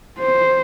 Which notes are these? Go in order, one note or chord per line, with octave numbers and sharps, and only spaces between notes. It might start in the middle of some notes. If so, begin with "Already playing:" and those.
C5